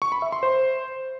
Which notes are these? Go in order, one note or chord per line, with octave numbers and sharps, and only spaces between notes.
C#6
B5
E5
C6
C5